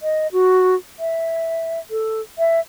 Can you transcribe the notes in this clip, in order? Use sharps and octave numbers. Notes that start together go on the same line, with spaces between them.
D#5
F#4
E5
A4
E5